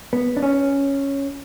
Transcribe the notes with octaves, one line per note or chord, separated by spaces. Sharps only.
B3
D4
C#4